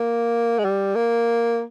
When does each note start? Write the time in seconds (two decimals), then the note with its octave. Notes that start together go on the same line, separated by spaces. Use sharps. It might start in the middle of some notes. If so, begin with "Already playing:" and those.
Already playing: A#3
0.59 G#3
0.64 G3
0.95 A#3